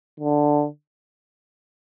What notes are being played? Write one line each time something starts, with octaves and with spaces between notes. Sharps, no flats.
D3